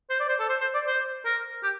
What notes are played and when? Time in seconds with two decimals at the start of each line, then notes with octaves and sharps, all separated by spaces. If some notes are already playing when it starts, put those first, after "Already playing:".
0.10 C5
0.20 D5
0.29 C5
0.39 A4
0.49 C5
0.61 C5
0.74 D5
0.87 C5
1.25 A#4
1.63 G4